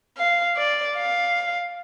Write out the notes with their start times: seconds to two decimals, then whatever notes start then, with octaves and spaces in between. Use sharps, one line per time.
0.17 F5
0.57 D5
0.97 F5